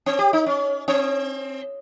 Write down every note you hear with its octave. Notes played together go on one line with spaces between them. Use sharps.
C4
G4
D#4
C#4
C4